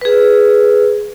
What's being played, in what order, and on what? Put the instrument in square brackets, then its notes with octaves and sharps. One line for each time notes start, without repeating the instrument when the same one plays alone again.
[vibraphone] G#4 B4